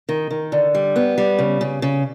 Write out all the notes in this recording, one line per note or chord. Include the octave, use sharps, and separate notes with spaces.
D#3
D#3
D3
G3
B3
G3
C#3
C#3
C#3